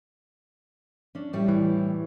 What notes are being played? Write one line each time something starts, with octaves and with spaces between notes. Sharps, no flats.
C#4 D4
A2 G3 C#5
E3